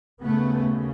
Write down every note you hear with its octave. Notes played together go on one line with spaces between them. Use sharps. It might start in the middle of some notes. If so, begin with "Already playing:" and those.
D#2 C#3 A3 B3